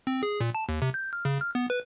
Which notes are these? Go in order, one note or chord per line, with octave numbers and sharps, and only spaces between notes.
C4
G#4
A#2
A5
D#2
C3
G6
F6
C#3
F6
B3
B4